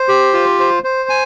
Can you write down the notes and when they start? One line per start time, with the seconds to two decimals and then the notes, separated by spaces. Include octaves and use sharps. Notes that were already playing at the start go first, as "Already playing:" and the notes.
Already playing: C5
0.08 G4
0.33 F4
0.60 C5
0.84 C5
1.09 G#5